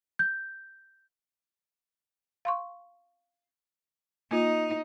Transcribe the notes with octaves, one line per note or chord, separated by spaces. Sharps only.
G6
F5 C6 C#6
A#3 D#4 F4